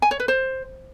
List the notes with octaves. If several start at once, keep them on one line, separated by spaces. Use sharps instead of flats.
G#5
C#5
B4
C5